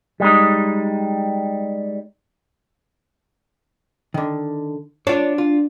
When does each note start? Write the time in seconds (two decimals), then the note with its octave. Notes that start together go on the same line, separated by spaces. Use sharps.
0.20 G3 G#3 D#4
4.14 D3 D#3
5.07 D4 F4 C#5
5.38 F4